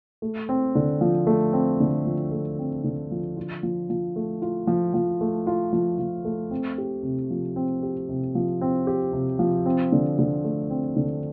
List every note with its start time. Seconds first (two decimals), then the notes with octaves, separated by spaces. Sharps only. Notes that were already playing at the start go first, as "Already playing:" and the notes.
0.22 A3
0.49 C4
0.75 D3
1.01 F3
1.27 A3
1.53 C4
1.80 D3
2.06 F3
2.31 A3
2.59 C4
2.84 D3
3.11 F3
3.37 F4
3.63 F3
3.90 F3
4.16 A3
4.42 F4
4.67 F3
4.94 F3
5.21 A3
5.47 F4
5.73 F3
5.99 F3
6.25 A3
6.51 C4
6.78 G4
7.03 C3
7.30 F3
7.56 C4
7.83 G4
8.09 C3
8.35 F3
8.61 C4
8.87 G4
9.13 C3
9.39 F3
9.66 C4
9.92 D3
10.18 D3
10.44 A3
10.70 C4
10.96 D3